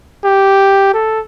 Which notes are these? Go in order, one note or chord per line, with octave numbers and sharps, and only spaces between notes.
G4
A4